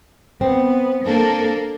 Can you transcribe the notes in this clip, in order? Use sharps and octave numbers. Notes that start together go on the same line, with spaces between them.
B3 C4
A#3 D4 A4